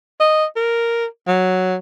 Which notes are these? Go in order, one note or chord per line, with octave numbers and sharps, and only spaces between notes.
D#5
A#4
F#3